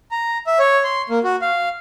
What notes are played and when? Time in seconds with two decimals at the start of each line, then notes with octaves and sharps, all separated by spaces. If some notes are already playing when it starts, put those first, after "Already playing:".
0.11 A#5
0.47 E5
0.59 C#5
0.84 C6
1.10 A#3
1.24 F#4
1.42 F5